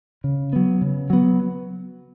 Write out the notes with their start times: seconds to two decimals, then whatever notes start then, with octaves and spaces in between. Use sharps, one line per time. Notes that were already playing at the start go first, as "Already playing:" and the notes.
0.24 C#3
0.53 F#3 B3
0.81 C#3
1.10 F#3 B3